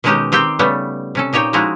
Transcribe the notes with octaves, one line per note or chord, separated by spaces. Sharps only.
B2 D#3 G#3 C#4 D#4 G4
D#3 C4 G4 G5
C#3 G3 A3 B3
C3 C#4 A4
A#2 D#4 G4 C#5
F3 G#3 D#4 E4 F#4